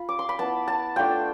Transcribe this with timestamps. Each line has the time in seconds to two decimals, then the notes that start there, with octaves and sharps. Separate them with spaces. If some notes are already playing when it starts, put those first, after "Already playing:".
Already playing: F4 B5
0.09 D6
0.19 C6
0.29 B5
0.39 B3 E4 A5
0.68 A5
0.96 A3 D4 F4 G5